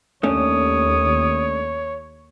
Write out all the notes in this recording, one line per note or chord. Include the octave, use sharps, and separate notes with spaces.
D#2 A3 C#4 D4 C#5 D#6